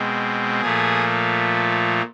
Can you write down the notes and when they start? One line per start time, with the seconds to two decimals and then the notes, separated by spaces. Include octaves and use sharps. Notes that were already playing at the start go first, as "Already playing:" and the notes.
Already playing: B2 G#3 C4
0.61 A#2 F3 A3 G#4